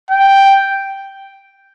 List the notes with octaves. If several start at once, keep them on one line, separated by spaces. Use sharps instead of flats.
G5